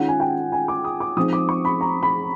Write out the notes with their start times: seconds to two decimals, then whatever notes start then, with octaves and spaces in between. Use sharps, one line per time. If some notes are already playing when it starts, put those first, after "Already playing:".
Already playing: D#3 G#3 C#4 F4 F#5
0.08 G#5
0.20 G5
0.52 G#5
0.68 D6
0.84 D#6
1.00 D6
1.17 F3 G#3 C4 D#4 D#6
1.33 D6
1.49 C#6
1.65 B5
1.81 A#5
2.03 B5